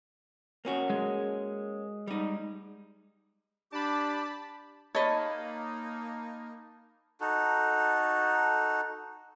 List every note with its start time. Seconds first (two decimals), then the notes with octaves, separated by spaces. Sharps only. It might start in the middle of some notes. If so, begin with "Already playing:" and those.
0.65 A#3 C#4 F#4
0.90 G#3
2.07 G3 D#4
3.72 D4 G4 A5 B5 D6
4.95 A#3 D#4 C#5 D#5 A5 B5
7.21 D#4 F#4 A4